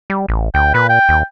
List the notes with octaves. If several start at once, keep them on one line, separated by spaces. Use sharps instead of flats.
G3
A1
D2 G5
A#2 B4
G5
D#2